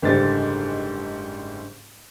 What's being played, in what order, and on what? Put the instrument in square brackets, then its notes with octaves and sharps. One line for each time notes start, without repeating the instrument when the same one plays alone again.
[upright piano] F#1 G#2 D3 G3 A6